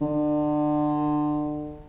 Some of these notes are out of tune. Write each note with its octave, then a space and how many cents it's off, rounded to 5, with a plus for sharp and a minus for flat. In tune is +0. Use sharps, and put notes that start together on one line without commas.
D3 +30